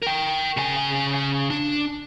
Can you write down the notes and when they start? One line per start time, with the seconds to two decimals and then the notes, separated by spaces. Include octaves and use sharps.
0.02 A#4 G5
0.57 C#3 G#5
1.50 D4